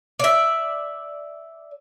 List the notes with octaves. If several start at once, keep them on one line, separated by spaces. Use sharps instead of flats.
D5 E5